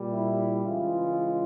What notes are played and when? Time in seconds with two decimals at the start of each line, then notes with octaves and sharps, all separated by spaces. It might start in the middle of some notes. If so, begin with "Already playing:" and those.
Already playing: A#2 G3
0.12 E4
0.65 C#3 E3 G#3 F4